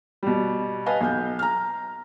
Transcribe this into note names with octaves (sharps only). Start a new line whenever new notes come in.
B2 G3
B4 D#5 F5 G#5 A5
B1 G#5 G6
A#5 F6